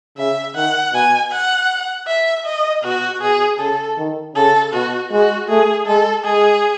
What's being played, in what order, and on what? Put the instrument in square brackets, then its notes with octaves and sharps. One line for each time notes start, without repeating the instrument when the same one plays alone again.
[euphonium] C#3 [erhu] E5
[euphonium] D#3 [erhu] F#5
[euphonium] B2 [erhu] G#5
[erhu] F#5
E5
D#5
[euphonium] B2 [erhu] F#4
[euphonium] B2 [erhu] G#4
[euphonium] C#3 [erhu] A4
[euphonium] D#3
[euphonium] C#3 [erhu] A4
[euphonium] B2 [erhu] F#4
[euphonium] G#3 [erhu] F#4
[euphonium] A3 [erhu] G#4
[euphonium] G#3 [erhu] A4
[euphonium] G#3 [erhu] G#4